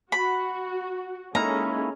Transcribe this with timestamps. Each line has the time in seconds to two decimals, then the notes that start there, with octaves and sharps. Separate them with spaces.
0.12 F#4 B5
1.35 G#3 A#3 C#4 D#4 E4 A4 A#5